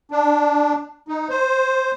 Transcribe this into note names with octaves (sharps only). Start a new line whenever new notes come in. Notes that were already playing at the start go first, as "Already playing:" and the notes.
D4
D#4
C5